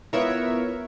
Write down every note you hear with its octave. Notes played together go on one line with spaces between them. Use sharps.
B3 E4 F4 A#4 C#5 E5